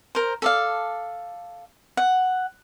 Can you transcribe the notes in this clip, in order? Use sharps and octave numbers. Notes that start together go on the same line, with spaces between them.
A#4 C5
A4 D5 F5
F#5